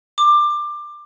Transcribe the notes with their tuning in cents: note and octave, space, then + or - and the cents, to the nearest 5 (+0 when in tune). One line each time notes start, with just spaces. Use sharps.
D6 +20